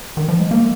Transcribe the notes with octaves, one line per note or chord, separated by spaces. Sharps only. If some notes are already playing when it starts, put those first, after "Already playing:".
D#3
F3
G#3
A#3